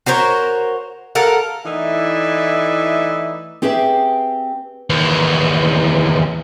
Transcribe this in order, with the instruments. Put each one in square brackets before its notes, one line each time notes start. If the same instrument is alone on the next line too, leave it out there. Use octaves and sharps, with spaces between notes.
[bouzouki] F#4 A#4 C5 C#5
A4 A#4 F5 F#5
[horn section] E3 A3 D#4 E4 D5 E5
[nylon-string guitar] C4 G4 G#4 B4 E5
[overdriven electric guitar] D#2 E3